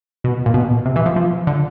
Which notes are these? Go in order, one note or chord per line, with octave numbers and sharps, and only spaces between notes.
B2
A#2
B2
C3
E3
F3
F3
D3